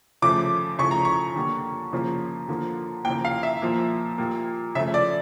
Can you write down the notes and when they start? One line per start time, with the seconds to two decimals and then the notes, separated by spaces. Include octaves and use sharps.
0.22 C#3 F3 A3 D6
0.79 C#3 F3 A3 C#6
0.91 A#5
1.05 C#6
1.36 D3 G3 A#3
1.93 C#3 F3 A#3
2.48 D3 F3 A#3
3.05 C#3 F3 A#3 G5
3.25 F5
3.43 E5
3.62 A#2 F3 A#3
4.18 A#2 G3 A#3
4.75 C#3 F3 A3 E5
4.94 D5